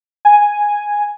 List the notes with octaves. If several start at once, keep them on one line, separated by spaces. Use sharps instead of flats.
G#5